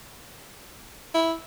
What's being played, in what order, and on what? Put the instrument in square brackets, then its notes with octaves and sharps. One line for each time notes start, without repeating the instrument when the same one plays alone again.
[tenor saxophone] E4